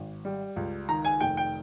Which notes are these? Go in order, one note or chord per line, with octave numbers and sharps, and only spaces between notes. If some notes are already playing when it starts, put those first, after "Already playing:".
Already playing: G#1
G3
C#2
D#3 A#5
G#5
F1 G5
G5